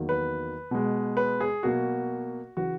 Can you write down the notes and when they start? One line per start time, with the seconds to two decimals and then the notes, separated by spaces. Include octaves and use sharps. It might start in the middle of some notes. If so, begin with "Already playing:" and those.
Already playing: E2 D#3 F#3 A#3
0.09 B4
0.71 B2 G#3
1.17 B4
1.41 G#4
1.63 B2 F#3 A#3 F#4
2.57 C#3 E3 F#4